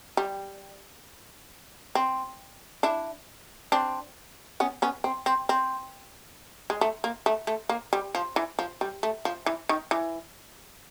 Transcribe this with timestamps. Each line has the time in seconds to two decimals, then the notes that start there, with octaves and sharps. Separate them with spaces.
0.17 G3
1.95 C4
2.83 D4 E4
3.72 C4 D4
4.60 B3 C#4
4.82 B3 C#4
5.04 C4
5.26 C4
5.49 C4
6.70 G#3
6.81 A3
7.04 A#3
7.26 A3
7.47 A3
7.69 A#3
7.93 G3
8.15 F3
8.36 E3
8.59 F3
8.81 G3
9.03 A3
9.25 F3
9.46 E3
9.69 D#3
9.91 E3